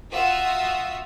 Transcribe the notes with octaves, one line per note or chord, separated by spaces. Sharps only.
F4 F#4 E5 F#5 D#6 E6